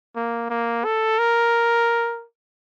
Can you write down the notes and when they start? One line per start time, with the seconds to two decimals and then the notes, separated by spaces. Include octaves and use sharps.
0.16 A#3
0.50 A#3
0.85 A4
1.19 A#4